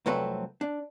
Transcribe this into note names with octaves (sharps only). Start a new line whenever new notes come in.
C2 F2 F#3 A3 C4 B4
D4